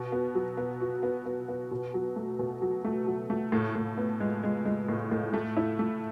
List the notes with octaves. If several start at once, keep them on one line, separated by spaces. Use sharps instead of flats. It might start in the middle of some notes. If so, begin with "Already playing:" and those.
Already playing: B2
B3
F#3
B3
F#4
B3
B3
B3
B2
F#3
A3
B2
F#3
A3
F#3
A3
A2
A2
B3
G#3
G#3
G#3
A2
A2
A3
E4
A3